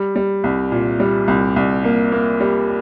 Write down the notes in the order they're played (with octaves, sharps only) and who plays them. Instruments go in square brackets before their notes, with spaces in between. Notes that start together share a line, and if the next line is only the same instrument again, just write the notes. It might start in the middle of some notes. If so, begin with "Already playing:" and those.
Already playing: [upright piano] G3
G3
C2
A#2
G3
C2
C2
A#3
A#3
G3